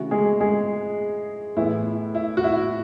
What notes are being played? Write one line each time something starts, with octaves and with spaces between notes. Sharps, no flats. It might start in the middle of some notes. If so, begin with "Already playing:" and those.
Already playing: C#3 E3 A3 F#4
G#3 G#4
G#3 G#4
A2 E3 B3 E4
E4
F#4
E4